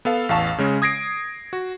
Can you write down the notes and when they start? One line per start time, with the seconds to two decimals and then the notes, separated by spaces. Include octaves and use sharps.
0.05 B3 A4 F5
0.29 A1 E2 F5 A5 C#6
0.58 C#3 G#3 C#4
0.82 D#6 G#6 A#6 C7 D7
1.53 F#4